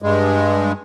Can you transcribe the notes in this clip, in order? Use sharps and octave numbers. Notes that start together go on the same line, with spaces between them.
G2 G#3